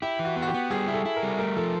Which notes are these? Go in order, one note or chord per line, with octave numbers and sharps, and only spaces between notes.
E4 G4
E3
F#4
B3
F#4
G4
B3
G3 G#4
E4
A4
E4
A#4
G3
A3 A#4
F3 A4